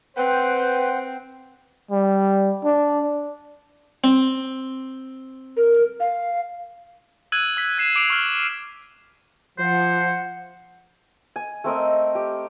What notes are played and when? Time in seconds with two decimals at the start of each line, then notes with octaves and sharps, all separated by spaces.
0.17 C4 B4 C5 F#5 G5
1.91 G3
2.64 D4
4.04 C4
5.57 A#4
6.00 F5
7.32 E6 F#6 G#6 D#7 F#7
7.57 E6 B6
7.78 G#6 C7 E7
7.96 D6 C7 D7 F7
8.10 C#6 F6 F#7
9.58 F3 C5 F#5
11.36 G#5
11.64 A3 C4 A#4 D#5
12.15 G4